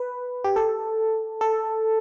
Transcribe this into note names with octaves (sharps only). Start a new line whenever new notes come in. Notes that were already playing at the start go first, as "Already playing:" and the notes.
Already playing: B4
G4
A4
A4